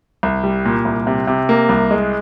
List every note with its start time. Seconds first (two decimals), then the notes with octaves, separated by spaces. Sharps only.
0.23 C2
0.44 G3
0.65 A#2
0.85 C2
1.07 C3
1.27 C3
1.49 A#3
1.69 C2
1.91 G#3